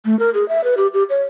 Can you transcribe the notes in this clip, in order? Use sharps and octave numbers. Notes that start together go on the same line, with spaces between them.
A3
A#4
G#4
E5
B4
G4
G4
C#5